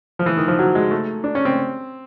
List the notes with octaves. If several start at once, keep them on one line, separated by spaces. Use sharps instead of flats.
F3
E3
D#3
F3
F#3
G#3
A3
D4
C#4
C4